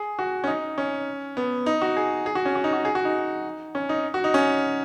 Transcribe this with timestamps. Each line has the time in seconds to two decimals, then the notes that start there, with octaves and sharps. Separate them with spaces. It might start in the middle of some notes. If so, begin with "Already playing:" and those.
Already playing: G#4
0.19 F#4
0.44 C#4
0.47 D#4
0.78 C#4
1.37 B3
1.66 D#4
1.81 F#4
1.97 G#4
2.26 G#4
2.35 F#4
2.45 C#4
2.55 F#4
2.64 D#4
2.73 F#4
2.85 G#4
2.95 F#4
3.05 D#4
3.75 C#4
3.89 D#4
4.14 F#4
4.24 D#4
4.34 C#4